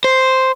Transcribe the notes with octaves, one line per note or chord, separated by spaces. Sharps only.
C5